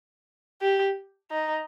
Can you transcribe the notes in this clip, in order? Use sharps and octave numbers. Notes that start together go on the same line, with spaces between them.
G4
D#4